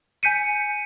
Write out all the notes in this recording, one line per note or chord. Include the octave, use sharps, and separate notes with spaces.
G#5 G6 B6 C#7 D#7